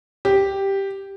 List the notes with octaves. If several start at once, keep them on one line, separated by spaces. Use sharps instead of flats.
G4